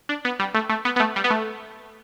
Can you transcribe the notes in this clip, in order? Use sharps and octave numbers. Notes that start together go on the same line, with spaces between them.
D4
B3
G3
A3
A3
B3
B3
A3
G3
B3
A3